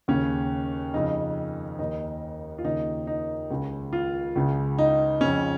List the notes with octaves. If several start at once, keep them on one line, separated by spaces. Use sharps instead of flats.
D#2 C#3 C#4
F2 C#3 D#4
D#2 D#3 D#4
F4
D#2 C#3 D#4
D#4
C#2 C#3
F4
C#2 C#3
D#4
F2 C#3 C#4